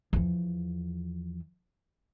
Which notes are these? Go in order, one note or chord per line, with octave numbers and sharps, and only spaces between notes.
E2 F3